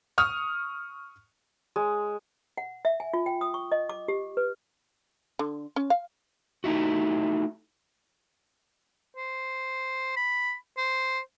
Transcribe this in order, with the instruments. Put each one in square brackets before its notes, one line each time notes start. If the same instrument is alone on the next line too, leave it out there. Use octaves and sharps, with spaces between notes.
[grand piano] C#6 D#6 F6
[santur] G#3
[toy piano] F#5
E5
G#5
F4
G5
D#6
C#6
D#5
D6
G4
B4
[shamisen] D3
C#4
F5
[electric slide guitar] A3 D#4 E4 F#4
[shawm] C5
B5
C5